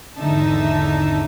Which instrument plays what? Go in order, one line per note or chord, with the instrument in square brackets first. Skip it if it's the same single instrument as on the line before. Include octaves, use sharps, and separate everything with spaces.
[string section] G#1 E2 D3 D#4 E5 A5